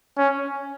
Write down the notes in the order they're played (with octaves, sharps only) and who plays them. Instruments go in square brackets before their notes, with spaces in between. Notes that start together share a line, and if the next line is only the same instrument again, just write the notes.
[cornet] C#4